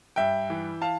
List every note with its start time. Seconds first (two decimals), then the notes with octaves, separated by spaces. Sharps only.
0.16 G2 E5 G5
0.50 E3
0.82 F5 A5